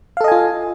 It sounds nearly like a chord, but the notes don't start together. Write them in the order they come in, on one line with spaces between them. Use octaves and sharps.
F5 A4 D#5 G#5 F4